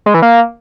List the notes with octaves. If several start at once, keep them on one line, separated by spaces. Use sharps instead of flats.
G#3
E3
A#3